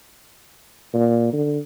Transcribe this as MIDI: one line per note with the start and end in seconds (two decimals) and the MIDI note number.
0.94 1.32 46
1.33 1.59 50